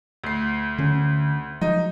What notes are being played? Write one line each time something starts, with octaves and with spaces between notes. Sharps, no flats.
D2 C7
D3 C#4
F3 F#3 G#3 D#4